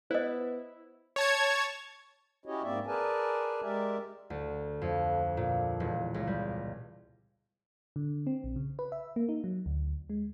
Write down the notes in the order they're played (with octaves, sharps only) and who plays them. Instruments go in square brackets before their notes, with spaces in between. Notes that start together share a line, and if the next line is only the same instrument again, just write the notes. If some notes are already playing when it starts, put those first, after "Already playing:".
[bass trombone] B3 [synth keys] E4 [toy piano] C5 D#5
[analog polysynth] C#5 A5 G#6
[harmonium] C#4 E4 F#4 G4 C#5 D#5
G#2 A#3 C4 D5 E5
G#4 A#4 B4 D5 G#5 A5
G#3 G4 A#4 D5 E5
[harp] D2
F2
A#2
E1
C#2
G3
[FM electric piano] D3
C4
A#1
C#3
B4
E5
A#3
D#4
F#3
D2
G#3